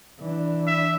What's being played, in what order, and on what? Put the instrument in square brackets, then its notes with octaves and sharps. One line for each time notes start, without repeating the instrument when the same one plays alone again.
[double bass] E3 D4
[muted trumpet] E5